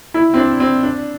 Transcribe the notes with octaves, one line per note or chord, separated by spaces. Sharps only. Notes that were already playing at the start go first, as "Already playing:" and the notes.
E4
C4
D4
C4
D4